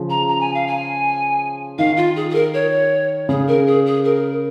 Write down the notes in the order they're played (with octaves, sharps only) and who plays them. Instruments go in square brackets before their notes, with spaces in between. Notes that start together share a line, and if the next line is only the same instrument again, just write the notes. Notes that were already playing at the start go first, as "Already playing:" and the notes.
Already playing: [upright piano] C#3 F3
[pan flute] A#5
A#5
G#5
F5
G#5
[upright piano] D#3 [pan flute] F5
[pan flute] F4
G#4
G#4
A#4
C#5
[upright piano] C#3 [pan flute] G#4
[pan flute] A#4
G#4
G#4
A#4